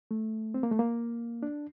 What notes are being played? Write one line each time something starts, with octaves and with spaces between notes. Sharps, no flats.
A3
C4
A#3
A3
A#3
D4